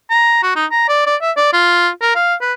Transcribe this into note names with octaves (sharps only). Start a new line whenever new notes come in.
A#5
F#4
D#4
A#5
D5
D5
E5
D5
F4
A#4
F5
B4